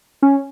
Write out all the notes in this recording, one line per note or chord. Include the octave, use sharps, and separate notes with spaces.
C#4